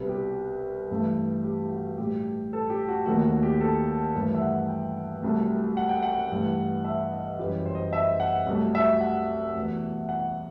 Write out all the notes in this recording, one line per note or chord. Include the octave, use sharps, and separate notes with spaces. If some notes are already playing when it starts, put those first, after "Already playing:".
Already playing: C2 B2 G3 B4
G4
G2 E3 A3
G4
F#4
A2 G3 G4
A4
G4
F#4
D#2 D#3 A3 F#4
F#4
G4
A4
G2 E3 A3
E5
F#5
G5
C2 C3 F#3 A3
F#5
G5
F#5
G2 E3 A3
E5
D#5
F#2 E3 G3 G4
C5
D#5
E5
F#5
C2 C3 F#3 A3
E5
F#5
E2 B2 A3
F#5